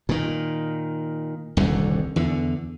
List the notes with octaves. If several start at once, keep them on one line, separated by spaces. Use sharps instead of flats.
A#2 D#3
D#1 C2 F#2 D3
E2 D3